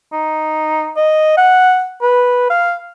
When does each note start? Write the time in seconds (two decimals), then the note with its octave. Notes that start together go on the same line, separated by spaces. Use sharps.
0.13 D#4
0.96 D#5
1.37 F#5
2.02 B4
2.50 F5